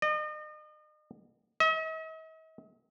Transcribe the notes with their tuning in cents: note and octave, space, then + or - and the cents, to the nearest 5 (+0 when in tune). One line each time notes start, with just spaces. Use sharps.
D#5 -40
D#5 +45